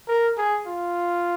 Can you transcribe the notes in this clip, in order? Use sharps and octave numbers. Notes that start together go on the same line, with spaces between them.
A#4
G#4
F4